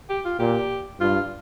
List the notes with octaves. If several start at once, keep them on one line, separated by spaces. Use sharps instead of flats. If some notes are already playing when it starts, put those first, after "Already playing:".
G4
F4
A#2 G4
G2 F4